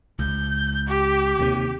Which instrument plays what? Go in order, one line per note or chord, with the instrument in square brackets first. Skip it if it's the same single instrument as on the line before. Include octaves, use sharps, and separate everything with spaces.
[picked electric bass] C#2 [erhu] G6
[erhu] G4
[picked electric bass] D#2 C3